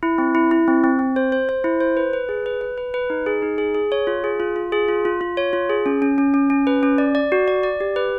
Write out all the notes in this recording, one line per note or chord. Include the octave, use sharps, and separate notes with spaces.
E4
C4
E4
E4
C4
C4
C4
C5
C5
C5
E4
C5
B4
B4
G#4
B4
B4
B4
B4
D#4
G#4
D#4
G#4
G#4
C#5
F4
G#4
F4
F4
G#4
F4
F4
F4
C#5
F4
G#4
C#4
C#4
C#4
C#4
C#4
B4
C#4
D5
D5
F#4
D5
D5
G4
B4